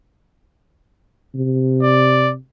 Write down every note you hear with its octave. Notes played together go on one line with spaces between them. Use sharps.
C3
D5